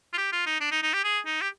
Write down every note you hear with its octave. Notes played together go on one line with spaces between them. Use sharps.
F4
G4
F4
D#4
D4
D#4
D#4
G4
G#4
D#4
G4